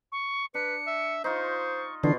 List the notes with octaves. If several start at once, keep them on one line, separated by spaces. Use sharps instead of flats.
C#6
D4 B4 C#7
E5
D#4 F4 C5 C#6
B2 D3 E3 D4 F4 C7